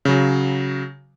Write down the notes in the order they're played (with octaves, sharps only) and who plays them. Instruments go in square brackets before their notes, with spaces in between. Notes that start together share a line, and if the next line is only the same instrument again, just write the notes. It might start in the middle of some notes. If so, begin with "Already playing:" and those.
[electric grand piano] C#3 F#3